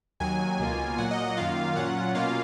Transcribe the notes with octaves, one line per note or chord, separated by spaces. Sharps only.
D#2 D#3 F#3 G#5
C#2 B2 A#3 F4
A#2 F#3 A#3 F#5
D#5
D#5
F#2 D#3 A#3 F4 F5
A#2 F#3 C#4 F4 F#5
B2 A#3 C#4 F4 F5